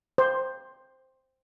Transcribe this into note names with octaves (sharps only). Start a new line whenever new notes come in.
C5